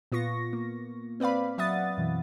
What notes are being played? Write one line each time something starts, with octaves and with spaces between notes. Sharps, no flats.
A#2 B3 F4 C#6 A#6
A#3
C4 B4 D5 F5 B5
F#3 E5 F#5 D#6 A6
F#2 B2 E3